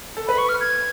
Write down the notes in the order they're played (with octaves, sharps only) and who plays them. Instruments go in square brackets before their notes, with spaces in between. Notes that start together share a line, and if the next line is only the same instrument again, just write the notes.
[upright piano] A4
[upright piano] B4 [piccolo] B5
[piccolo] C#6
F6
G#6